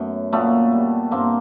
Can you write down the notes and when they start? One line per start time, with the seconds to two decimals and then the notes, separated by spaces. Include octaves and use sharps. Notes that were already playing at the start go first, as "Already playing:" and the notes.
Already playing: F#2 A3 B3
0.32 A#2 A3 B3
0.72 G3
1.11 G2 A#3 C4